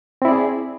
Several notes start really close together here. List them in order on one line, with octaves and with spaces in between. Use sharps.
C4 E4 D5 G#4